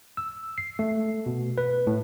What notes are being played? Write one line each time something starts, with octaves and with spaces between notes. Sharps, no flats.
E6
C7
A3
B2
B4
A2